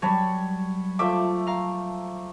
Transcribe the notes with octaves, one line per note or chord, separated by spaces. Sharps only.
F#3 G3 C#5 A5 B5
F3 A3 E5 D6
F5 A#5